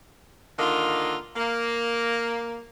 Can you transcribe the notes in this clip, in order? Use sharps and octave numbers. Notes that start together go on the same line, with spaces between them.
D3 D#3 A#3 F4
A#3